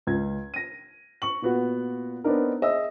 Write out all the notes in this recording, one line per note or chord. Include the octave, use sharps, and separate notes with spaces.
C#2 G#6
A#6 D#7
C#6 F#7
A#2 B3 F#4
B3 C4 D4 D#4 A#4
G#4 D#5 E5 E6